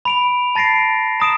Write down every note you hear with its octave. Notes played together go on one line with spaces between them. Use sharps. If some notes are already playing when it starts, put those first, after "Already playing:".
B5 D7 F7
A5 A6 A#6 C7 D7
A#5 D#6 D7 E7